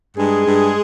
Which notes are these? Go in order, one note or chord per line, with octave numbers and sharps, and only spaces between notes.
G2 G#3 G#4
G2